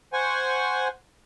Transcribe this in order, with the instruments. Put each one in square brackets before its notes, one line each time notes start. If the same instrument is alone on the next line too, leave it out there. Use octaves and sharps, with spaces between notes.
[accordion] C5 F#5 G#5 C#6